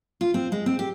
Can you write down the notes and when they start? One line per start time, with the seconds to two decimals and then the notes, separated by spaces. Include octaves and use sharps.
0.21 F4
0.34 C4
0.52 G#3
0.66 C4
0.79 G4